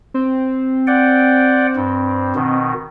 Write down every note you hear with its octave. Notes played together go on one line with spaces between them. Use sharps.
C4
D5 F#5 G5
G2
B2 D#3